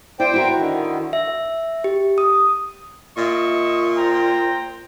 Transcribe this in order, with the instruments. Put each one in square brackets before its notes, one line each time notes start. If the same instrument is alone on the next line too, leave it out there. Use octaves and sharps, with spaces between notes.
[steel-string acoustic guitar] E4 D5 [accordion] C5 G5
[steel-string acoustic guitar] E4 F#4 A#4
[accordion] D3 D#3
[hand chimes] E5
G4
D#6
[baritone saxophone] A#2 [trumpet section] D#5 E5 C#6
[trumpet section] C5 G5 A#5